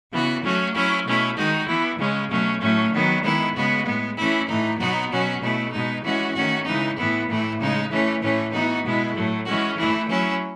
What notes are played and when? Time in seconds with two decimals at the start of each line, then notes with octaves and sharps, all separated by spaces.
0.11 C#3 E3 B3 F#4
0.43 F#3 A3 C#4 F#4
0.73 F#3 C#4 E4
1.05 B2 A3 C#4 E4
1.36 D#3 G#3 D#4 F#4
1.67 E3 B3 E4
1.99 C#3 G#3 C#4
2.30 B2 F#3 A3 C#4
2.61 A2 F#3 A3 C#4
2.92 D#3 F#3 B3
3.23 D#3 G#3 B3 E4
3.54 C#3 G#3 B3 F#4
3.85 A2 G#3 B3
4.17 E3 A3 C#4 E4
4.48 A2 E3 A3 D#4
4.79 B2 F#3 B3 D#4 F#4
5.10 B2 F#3 C#4 F#4
5.41 B2 A3 E4
5.72 B2 G#3 D#4
6.03 E3 G#3 C#4 F#4
6.34 D#3 A3 C#4 F#4
6.66 C#3 E3 G#3 D#4
6.96 A2 E3 B3 E4
7.28 A2 E3 A3 E4
7.59 C#3 G#3 D#4
7.90 E3 A3 C#4
8.21 A2 E3 A3 C#4
8.53 E3 B3 D#4 F#4
8.83 B2 G#3 B3 E4
9.15 A2 F#3 A3
9.46 E3 G#3 C#4 F#4
9.77 E3 A3 E4
10.08 F#3 C#4 E4